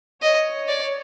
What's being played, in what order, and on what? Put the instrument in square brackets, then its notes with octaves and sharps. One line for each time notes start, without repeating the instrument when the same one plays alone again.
[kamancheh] C#5 [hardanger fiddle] D#5
[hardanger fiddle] D5